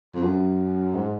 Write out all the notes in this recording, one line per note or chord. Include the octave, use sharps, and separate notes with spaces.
F2
F#2
G#2